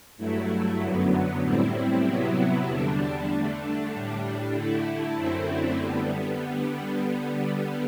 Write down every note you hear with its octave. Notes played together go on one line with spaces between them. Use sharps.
G2 F#3 A3 E4
F#2 D3 F#3 B3
A2 G3 C4 E4
C3 F#3 B3 E4
E2 D3 G3 D4
D3 A3 D4
A2 G3 D4
D3 A3 E4
F#2 D3 A3 C4 E4
D3 G3 B3